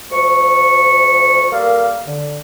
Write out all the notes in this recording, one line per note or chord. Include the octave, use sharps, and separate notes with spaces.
D2 F3 C#6
G3 A#3 A4 A#4 F5
D3